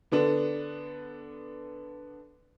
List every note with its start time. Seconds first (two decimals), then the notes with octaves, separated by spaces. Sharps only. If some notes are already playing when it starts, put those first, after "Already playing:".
0.12 D3 B3 D4